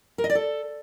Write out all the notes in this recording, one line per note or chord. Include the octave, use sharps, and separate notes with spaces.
A#4
D#5
D5
A4